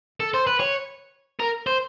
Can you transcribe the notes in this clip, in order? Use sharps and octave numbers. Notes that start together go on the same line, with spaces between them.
A4
C5
B4
C#5
A#4
C5